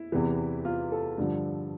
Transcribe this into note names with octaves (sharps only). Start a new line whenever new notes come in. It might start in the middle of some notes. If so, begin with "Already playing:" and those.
Already playing: E4
E2 C3 E3
F4
A4
G2 D3 F3